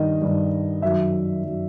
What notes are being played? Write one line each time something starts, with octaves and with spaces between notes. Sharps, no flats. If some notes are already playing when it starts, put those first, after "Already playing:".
Already playing: G2 D#3 D#5
G2 D#3
F#2 D#3 E5
F#2 D#3